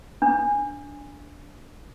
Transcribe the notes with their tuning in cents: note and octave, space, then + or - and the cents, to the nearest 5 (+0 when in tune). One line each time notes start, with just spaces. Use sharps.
D4 -10